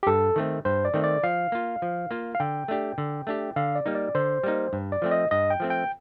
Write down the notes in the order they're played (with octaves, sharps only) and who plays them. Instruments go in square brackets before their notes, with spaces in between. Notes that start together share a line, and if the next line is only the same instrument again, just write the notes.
[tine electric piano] G4
[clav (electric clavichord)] G2 [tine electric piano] A4
[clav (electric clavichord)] D#3 A3 C4
[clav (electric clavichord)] G2 [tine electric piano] C5
[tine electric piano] D5
[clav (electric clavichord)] D#3 A3 C4
[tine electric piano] D5
[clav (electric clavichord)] F3 [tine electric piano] F5
[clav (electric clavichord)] A#3 F4
F3
A#3 F4
[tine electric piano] F5
[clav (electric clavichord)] D3 [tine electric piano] G5
[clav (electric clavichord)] A3 D4 G4
D3
A3 D4 G4
[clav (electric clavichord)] D3 [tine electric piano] F5
[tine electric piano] D5
[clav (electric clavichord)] G3 A#3 D#4
[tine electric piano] D5
[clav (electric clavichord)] D3 [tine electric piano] C5
[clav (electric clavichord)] G3 A#3 D#4
G2
[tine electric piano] D5
[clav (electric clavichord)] F3 A3 C4
[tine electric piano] D#5
[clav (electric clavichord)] G2 [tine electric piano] D#5
[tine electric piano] G5
[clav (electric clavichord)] F3 A3 C4
[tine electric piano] G5